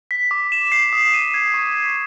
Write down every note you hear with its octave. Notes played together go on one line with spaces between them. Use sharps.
B6
D6
E7
C7
D#6
D#7
G#6
C#6
B6